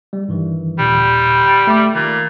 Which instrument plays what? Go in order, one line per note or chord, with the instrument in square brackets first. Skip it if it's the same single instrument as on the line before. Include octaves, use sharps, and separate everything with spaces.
[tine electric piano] G3
G2 D#3 E3
[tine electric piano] D#2 A#2 D3 [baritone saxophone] G3
[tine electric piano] A3 D6
[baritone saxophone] A#2 [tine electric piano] D#3